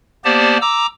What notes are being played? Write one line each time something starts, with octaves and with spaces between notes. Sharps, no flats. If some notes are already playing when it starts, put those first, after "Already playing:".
A#3 B3 G4 C5 D5 A5
A#5 D6 E6